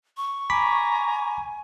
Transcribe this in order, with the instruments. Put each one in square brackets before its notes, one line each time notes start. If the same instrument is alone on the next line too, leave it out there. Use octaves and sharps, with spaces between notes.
[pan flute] C#6
[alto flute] G#5 [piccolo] A#5 [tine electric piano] B5 D6 B6